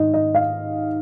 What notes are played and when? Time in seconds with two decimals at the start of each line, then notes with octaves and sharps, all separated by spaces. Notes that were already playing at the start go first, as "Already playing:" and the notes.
Already playing: G#2 D#3 D#5
0.14 D#5
0.34 F5